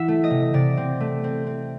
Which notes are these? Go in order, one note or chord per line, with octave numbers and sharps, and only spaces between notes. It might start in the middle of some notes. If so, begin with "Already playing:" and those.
Already playing: E3 E5 F#5
A3
D#5
C3
C3 D5
C4
A3
C4
C4